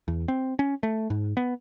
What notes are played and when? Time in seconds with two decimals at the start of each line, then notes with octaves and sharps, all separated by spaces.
0.08 E2
0.28 C4
0.59 C#4
0.83 A3
1.10 G#2
1.37 B3